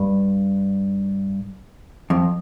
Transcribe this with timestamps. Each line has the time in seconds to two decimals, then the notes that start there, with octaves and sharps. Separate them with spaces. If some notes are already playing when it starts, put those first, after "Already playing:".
Already playing: G2
2.10 F2